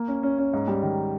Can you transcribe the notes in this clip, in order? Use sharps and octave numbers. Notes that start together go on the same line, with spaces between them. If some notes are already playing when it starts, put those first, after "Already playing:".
Already playing: A#3
C#4
C#4
C#4
G#2
G3
D#3